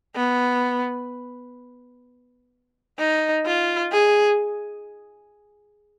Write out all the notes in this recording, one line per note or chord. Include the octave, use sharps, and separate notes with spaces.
B3
D#4
F4
G#4